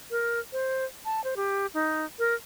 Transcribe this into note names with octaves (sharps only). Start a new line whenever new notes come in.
A#4
C5
A5
C5
G4
D#4
A#4